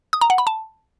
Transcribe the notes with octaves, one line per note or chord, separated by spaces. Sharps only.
D#6
A#5
F#5
B5
A5